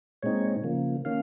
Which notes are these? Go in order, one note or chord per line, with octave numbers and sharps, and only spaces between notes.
A#2 G#3 C4 D#4 C#5
C#3 F3 A#3
D#3 A#3 C#4 F5